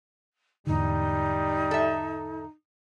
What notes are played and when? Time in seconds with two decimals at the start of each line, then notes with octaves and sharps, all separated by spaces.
0.67 E2 G#2 D3 G3 D#4
1.71 A4 E5